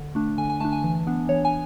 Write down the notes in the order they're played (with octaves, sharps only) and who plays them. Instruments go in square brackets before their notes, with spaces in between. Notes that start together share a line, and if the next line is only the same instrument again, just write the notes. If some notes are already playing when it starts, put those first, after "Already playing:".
Already playing: [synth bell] D3
A3 D4
D3 G#5
G#5
A3 D4 A5
G#5
E3
B3 D4
E3 C#5
G#5